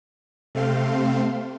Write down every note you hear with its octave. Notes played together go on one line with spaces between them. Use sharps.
C3 A3 C4 F5 C6